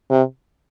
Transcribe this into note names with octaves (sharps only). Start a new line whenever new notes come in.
C3